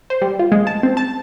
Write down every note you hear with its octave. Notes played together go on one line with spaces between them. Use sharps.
C5
G3
F4
G#3
A5
C4
A5